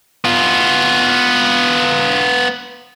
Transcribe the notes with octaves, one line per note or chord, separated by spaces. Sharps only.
B3 F4